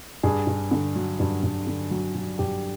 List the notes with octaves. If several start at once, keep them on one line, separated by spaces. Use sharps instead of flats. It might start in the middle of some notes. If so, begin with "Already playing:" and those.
G2 G#4
G2
D3
F#3
G2
G2
D3
F#3
F#3
G2 G4